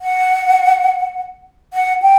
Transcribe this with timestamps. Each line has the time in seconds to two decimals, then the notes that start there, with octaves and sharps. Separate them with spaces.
0.01 F#5
1.73 F#5
2.02 G5